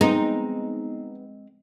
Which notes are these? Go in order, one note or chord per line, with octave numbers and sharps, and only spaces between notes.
G#3 B3 C4 D#4